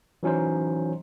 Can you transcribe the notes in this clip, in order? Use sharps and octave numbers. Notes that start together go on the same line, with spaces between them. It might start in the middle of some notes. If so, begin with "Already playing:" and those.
E3 F#3 C#4 D#4 C5